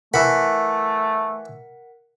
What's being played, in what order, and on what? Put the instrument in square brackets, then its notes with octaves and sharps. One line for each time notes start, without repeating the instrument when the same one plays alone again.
[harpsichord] E3 B5 [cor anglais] A3 [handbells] A#4 F#5 B6